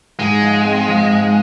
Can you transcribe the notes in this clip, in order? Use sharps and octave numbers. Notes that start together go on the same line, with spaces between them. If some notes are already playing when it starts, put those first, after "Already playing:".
G#2 G#3
F3
C4
F3
G#2